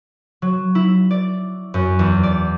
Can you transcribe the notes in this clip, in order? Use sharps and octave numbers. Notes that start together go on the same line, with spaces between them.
F#3
E4
D5
F#2
E2
D5